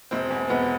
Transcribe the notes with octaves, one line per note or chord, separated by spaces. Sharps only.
E1 C4
E2
E1 B3